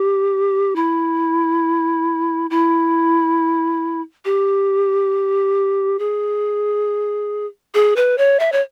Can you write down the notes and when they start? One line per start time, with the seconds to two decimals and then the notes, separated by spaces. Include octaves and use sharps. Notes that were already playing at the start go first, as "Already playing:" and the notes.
Already playing: G4
0.76 E4
2.50 E4
4.25 G4
5.99 G#4
7.74 G#4
7.96 B4
8.18 C#5
8.39 E5
8.52 C#5